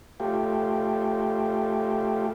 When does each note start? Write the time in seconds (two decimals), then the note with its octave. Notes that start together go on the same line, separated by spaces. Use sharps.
0.20 A3 F4 G4